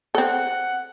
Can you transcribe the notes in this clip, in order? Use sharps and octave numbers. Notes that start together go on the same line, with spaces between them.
C4 A4 F#5